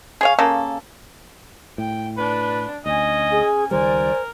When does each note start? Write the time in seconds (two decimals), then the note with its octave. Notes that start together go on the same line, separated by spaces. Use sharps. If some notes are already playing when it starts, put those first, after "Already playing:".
0.21 G#4 C#5 F5
0.39 C#3 A#3 C#4 A4
1.78 A2 G5
2.17 D4 B4
2.86 D2 C#4 D#5 G#5
3.32 G#4
3.71 C#2 D#3 G3 A#4 C5 D5 G#5